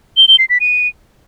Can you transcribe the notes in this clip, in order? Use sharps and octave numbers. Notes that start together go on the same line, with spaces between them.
G7
G7
C7
B6
D#7